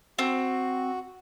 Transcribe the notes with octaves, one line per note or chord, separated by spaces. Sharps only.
C4 F#4